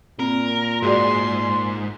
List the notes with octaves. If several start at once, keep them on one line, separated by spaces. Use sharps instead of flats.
A#2 C4 A#4
G#2 F#4 G#4 D5 C6